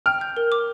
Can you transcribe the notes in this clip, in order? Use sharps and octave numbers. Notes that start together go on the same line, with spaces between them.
G5 F6
G6
A#4
D6